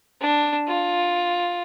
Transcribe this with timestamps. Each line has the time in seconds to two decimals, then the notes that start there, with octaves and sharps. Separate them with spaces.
0.21 D4
0.68 F4